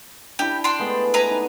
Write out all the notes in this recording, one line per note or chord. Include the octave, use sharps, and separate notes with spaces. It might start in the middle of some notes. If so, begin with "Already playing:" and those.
D4 E4 G4
D4 G5 C6
G#3 A3 B3
B4 G#5 A#5
D#4